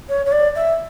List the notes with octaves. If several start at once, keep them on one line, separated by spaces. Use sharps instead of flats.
C#5
C#5
D5
E5